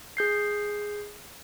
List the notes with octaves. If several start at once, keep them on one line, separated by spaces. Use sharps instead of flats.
G#4 G6 C7